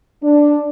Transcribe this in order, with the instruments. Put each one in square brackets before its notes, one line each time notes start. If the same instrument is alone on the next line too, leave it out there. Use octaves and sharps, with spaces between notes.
[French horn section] D4